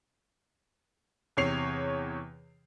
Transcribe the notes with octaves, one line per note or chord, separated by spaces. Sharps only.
E2 C3 C#5 C7 F7